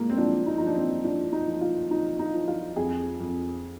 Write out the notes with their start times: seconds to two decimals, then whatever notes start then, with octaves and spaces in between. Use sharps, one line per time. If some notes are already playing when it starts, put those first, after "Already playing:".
Already playing: A#2 G#3 A#3
0.10 C4
0.17 F3 D4
0.46 D#4
0.58 F3 D#4
0.67 D4
0.75 C4
1.04 F3 D4
1.32 D#4
1.47 F3
1.61 F4
1.90 F3 D#4
2.19 D#4
2.34 F3
2.48 F4
2.76 F2 G#4
3.20 F2